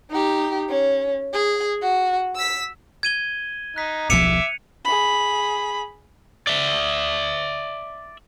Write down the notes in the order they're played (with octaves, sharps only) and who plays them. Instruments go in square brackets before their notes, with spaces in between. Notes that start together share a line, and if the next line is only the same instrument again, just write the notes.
[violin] D#4 G4
C#4
G#4
F#4
E6 B6
[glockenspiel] G#6 D#7 G7
[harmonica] D#4 [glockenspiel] F#6 B6
[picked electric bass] D#1 B1 F3 [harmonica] E5 D6 [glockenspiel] C#7 D#7 F7
[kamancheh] G#4 B5
[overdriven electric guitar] D5 E5